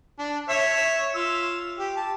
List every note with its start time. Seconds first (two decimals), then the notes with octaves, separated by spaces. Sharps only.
0.19 D4
0.49 C#5 E5
1.15 F4 E6
1.79 G4
1.96 A5